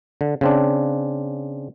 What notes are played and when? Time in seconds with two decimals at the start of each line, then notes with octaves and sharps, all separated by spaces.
0.21 D3
0.41 C#3 C4 D4